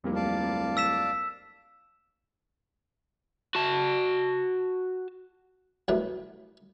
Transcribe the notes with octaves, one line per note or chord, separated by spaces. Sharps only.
D1 F2 G3 A#3
D5 F5 A5
E6 B6 E7
F#4 A5
C2 F#2 B2 E3 F#3 A3